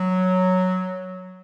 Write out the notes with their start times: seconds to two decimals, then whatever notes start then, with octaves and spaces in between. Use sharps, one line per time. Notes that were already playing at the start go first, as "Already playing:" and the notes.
Already playing: F#3